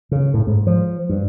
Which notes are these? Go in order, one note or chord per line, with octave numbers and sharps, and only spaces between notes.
C#3
A2
G#2
F3
G2